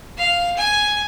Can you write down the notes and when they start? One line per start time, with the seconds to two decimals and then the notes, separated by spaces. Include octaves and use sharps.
0.18 F5
0.57 G#5